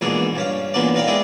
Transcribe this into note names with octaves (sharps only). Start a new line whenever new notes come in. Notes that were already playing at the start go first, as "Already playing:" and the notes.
A#1 G#2 B2 E3 D4 G#4
G2 C#4 F5
E2 A#2 D3 B3 A4 D5
D#4 A#4 D5 F5 G5 A#5
G#3 B3 D4 E4 G#4 G5